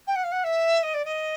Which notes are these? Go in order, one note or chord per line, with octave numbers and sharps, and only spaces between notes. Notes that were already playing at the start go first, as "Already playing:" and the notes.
G5
F#5
F5
F#5
E5
D#5
D5
D#5